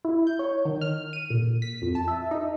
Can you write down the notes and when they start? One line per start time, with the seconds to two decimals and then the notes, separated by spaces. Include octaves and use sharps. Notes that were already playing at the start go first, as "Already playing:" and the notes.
0.05 E4
0.27 G6
0.39 C#5
0.65 D#3
0.81 F6
1.13 D#7
1.30 A#2
1.62 B6
1.82 F2
1.95 A5
2.08 E5
2.31 D#4